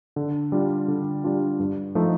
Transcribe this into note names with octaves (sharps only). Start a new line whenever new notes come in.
D3
G3 D4 F4
D3
G3 D4 F4
G2
F3 A3 D#4